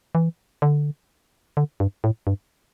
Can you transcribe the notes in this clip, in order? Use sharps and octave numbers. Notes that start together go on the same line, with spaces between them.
E3
D3
D3
G2
A2
G2